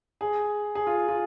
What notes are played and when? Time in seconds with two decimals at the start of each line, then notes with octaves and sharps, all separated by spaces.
0.21 G#4
0.75 G#4
0.87 F4
1.08 F4